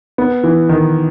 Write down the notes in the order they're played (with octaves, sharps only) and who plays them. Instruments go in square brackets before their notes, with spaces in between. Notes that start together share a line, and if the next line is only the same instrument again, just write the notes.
[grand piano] B3
E3
D#3